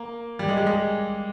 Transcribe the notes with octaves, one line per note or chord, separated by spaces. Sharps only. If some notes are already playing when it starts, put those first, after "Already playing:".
Already playing: A#3
G3
G#3
G3
G#3